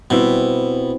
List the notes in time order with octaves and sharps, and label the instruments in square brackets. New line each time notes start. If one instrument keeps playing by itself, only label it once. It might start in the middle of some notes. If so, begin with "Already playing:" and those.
[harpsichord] B2 [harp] G3 C4 E4